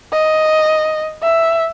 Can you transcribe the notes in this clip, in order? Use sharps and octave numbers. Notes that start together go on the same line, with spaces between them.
D#5
E5